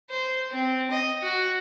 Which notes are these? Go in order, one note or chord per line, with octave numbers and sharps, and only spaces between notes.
C5
C4
D#5
F#4